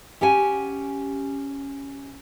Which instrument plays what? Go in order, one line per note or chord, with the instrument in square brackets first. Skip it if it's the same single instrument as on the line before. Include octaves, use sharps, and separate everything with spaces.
[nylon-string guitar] C#4 G4 F#5 G#5